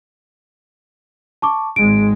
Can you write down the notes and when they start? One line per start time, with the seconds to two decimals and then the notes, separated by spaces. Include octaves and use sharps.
1.42 A5 C#6 D6
1.76 G#1 G#3 D7